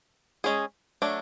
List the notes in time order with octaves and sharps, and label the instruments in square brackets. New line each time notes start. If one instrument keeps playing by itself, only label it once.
[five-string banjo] G#3 C#4 G#4
F#3 A3 D4